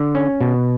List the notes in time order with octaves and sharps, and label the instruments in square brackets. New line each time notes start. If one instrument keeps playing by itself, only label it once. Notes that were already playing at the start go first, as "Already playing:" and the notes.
Already playing: [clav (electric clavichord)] D3
C#4
B2